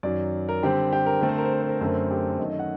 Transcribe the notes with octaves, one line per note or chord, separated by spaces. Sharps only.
F#2 D#3 F#3 D5
A#4
D3 G3 C4 G4
G4
A#4
D3 A3 C4 A#4
C5
A#4
C5
A#4
C5
A#4
C5
F#2 D3 A3 C4 A#4
G4
F#2 D#3 A3 D#5
D#5
F#5